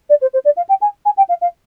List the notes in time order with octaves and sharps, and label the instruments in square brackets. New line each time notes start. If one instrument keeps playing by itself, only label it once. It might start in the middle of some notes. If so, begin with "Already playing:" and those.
[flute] D5
C5
C5
D5
F5
G5
G#5
G#5
G5
F5
F5